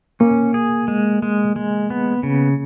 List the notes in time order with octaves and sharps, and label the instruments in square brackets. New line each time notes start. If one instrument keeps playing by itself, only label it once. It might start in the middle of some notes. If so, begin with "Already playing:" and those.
[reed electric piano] A#3 [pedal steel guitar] C#4
[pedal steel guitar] G#4
G#3
G#3
G#3
B3
C#3